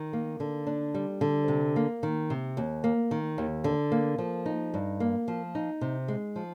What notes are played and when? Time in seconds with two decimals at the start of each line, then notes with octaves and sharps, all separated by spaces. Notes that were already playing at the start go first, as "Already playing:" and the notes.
Already playing: D#3
0.13 A#3
0.40 D3
0.67 D4
0.94 G3
1.21 D3
1.48 C3
1.76 A#3
2.03 D#3
2.30 C3
2.57 D#2
2.84 A#3
3.11 D#3
3.38 D#2
3.64 D3
3.92 A#3
4.18 F3
4.46 D#4
4.74 G2
5.00 A#3
5.28 F3
5.55 D#4
5.81 C3
6.08 G#3
6.36 F3